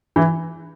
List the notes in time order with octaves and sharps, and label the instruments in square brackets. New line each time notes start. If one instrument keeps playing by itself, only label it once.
[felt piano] E3 E4